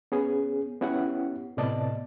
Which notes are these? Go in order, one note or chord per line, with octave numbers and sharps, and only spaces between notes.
B3 C#4 G#4
B3 C#4 E4 G4 F#5
A2 C3 B3 D5 D#5 A5